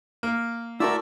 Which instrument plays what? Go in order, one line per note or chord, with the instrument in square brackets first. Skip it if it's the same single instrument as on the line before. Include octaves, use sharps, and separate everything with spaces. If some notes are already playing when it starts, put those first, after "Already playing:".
[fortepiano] A#3
[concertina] A3 D5 E6 [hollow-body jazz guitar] E4 F#4 A#4